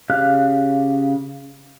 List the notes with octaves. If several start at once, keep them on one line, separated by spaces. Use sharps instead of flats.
C#3 G4 F5 F6 F#6